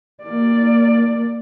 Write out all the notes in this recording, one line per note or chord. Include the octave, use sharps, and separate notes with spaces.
A#3 D5